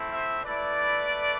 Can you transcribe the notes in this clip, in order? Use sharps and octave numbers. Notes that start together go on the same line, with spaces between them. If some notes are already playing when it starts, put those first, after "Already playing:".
Already playing: A3 C4 E4
C5 E5
A3 E4 B4 D5
A3